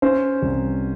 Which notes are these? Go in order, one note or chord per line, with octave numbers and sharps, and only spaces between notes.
C#4 C5
C2